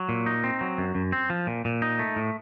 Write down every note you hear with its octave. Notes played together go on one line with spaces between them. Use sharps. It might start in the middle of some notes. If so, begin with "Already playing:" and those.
Already playing: F#3
A#2
D#4
C4
F#3
F#2
F#2
C4
F3
A#2
A#2
D#4
A3
A2